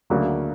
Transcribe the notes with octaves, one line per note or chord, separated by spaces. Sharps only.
D2 C#3 F#3 A#3